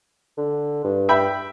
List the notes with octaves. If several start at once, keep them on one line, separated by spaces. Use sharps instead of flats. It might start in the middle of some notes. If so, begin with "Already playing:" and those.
D3
G2
E5 G5 B5